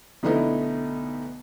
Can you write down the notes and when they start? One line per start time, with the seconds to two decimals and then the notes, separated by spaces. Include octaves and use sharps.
0.23 B1 D3 A3 B3 D#4 E4